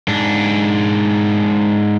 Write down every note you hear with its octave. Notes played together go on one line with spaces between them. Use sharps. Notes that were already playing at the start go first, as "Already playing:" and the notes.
G#2 D4